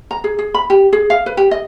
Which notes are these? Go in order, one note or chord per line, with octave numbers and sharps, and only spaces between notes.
A#5
G#4
G#4
B5
G4
G#4
F5
B4
G4
D#5